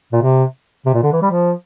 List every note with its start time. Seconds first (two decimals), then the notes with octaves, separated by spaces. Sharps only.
0.12 A#2
0.22 C3
0.85 C3
0.94 A#2
1.03 D3
1.12 E3
1.22 G3
1.31 F3